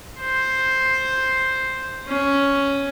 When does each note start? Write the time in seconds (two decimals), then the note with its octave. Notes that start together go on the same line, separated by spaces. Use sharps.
0.21 C5
2.08 C#4